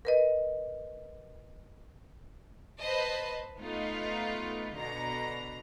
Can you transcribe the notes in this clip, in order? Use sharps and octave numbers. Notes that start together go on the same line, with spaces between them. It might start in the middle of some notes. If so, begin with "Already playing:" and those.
A#4 B4 D#5
B4 C5 D#5 A5 B5
A3 B3 D#4 F4
B2 D3 A#5